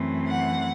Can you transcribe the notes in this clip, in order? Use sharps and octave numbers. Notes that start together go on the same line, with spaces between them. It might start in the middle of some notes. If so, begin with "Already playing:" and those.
Already playing: F#2 E3 A3 C4
F#5